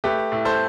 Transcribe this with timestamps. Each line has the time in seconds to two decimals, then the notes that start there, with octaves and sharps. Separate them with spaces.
0.04 A3 G4 B4
0.32 A2
0.45 A4 C5